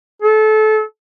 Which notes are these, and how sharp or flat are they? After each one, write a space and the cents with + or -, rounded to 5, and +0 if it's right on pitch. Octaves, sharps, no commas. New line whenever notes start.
A4 -25